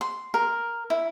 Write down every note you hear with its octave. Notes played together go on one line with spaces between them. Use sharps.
C6
A#4
E4